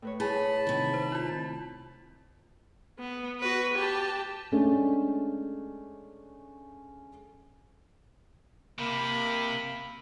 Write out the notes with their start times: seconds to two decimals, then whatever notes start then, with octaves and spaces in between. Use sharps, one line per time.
0.02 A2 B4 C#5
0.20 E4 G#4 A5 B5
0.67 C3 D#3
0.94 C5
1.12 E4 F4
2.99 B3
3.40 F#4 B4
3.74 G4 A5
4.52 G#3 A3 C#4 D4
8.79 C3 A#3 B5